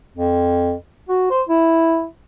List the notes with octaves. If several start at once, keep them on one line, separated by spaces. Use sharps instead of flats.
F2
F#4
C5
E4